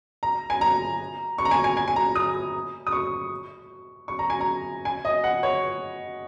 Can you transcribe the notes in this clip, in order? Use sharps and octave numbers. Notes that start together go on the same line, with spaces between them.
A#5
G#5
A#5
C#6
A#5
G#5
G#5
G#5
G#5
A#5
D#6
D#6
C#6
C#6
A#5
G#5
A#5
G#5
D#5
F#5
C#5